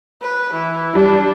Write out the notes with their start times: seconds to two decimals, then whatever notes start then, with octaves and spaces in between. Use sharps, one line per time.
0.22 B4
0.53 E3
0.95 G3 D4